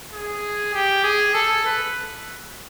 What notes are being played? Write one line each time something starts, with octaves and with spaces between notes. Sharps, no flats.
G#4
G4
G#4
A4
B4